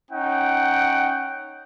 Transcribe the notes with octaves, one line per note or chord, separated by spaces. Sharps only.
C#4 D#4 F#5 G5